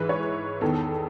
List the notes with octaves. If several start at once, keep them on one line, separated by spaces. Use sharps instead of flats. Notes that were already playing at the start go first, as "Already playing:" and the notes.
Already playing: G#2 E3 B4
C#5
B4
E2 D#3 A4